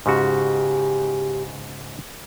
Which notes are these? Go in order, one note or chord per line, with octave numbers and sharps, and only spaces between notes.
G#2 C#3 F#4 G4